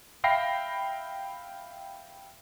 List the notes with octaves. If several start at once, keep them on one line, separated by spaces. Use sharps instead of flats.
E5 F5 G5 B5 A#6 C7